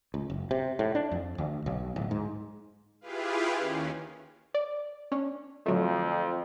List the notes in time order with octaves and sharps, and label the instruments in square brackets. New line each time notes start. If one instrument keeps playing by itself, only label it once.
[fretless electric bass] C#2
F#1
C3
A2
D4
F2
D2
B1
D1
G#2
[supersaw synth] E4 F4 G4 G#4 B4 F5
D#2 D#3 C#4
[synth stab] D5
C#4 D4
[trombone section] F2 [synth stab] D3 F#3 A3